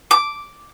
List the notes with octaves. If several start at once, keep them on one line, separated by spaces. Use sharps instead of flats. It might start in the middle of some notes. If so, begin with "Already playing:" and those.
D6